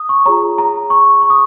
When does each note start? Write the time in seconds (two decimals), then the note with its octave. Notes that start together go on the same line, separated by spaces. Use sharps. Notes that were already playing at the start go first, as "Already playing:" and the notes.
Already playing: D#6
0.09 C#6
0.26 F4 G#4 C#5 A#5
0.58 A#5
0.90 C#6
1.22 C#6
1.30 D#6